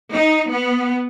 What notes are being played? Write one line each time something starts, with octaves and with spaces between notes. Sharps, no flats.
D#4
B3